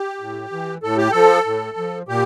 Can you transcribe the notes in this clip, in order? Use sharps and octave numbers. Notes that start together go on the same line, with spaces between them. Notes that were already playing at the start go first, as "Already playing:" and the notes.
Already playing: G4
A2
E3
A2 A4
G4
F3 A4
A2
F3
A#2 G4